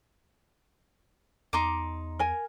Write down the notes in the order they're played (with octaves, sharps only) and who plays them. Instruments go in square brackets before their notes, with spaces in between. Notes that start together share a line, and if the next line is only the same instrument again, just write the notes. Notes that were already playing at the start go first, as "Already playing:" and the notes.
[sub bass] E2 [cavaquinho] D#4 C6 D6
[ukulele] A#4 G#5